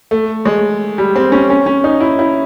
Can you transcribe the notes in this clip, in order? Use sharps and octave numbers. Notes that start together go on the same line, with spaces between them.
A3
G#3
G3
C4
C#4
C#4
C#4
D#4
E4
E4